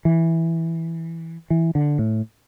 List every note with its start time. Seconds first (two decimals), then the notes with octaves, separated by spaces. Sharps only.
0.05 E3
1.50 E3
1.75 D3
1.99 A2